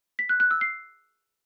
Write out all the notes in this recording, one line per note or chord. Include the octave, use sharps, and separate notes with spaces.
B6
F#6
F#6
E6
C7